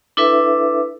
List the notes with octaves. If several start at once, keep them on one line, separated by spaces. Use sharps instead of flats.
D4 E4 A4 B4 E5